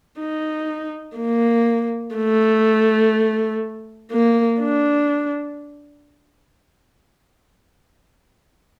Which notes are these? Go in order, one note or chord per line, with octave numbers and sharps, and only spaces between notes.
D#4
A#3
A3
A#3
D4